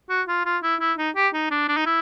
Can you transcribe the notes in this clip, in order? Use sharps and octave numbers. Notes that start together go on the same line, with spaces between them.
F#4
F4
F4
E4
E4
D#4
G4
D#4
D4
D4
D#4
E4